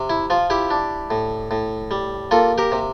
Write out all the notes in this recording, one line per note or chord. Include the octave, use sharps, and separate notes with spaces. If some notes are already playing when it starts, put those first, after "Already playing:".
Already playing: C3
E4
F3 F4
E4 G4
D4
A2
A2
G3
A#3 F4 A4
G4 A#4
C3